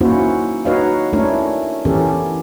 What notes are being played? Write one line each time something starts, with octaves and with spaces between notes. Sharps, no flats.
A#3 C#4 D#4 E4 F#4 C5
D#4 F#4 B4 C#5 D#5 F5
A3 C#4 D4 E4 A#4 C#5
E3 B3 C#4 G4 A4 A#4